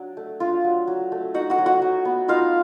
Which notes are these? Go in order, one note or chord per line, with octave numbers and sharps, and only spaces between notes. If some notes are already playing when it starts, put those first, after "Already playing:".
Already playing: F#3 D4
A3
D4 F4 F5
F#3
F#3
A3
D#4 F#4 F#5
F#4 F#5
F#3
F#4 F#5
F#3
B3
D#4 F4 F5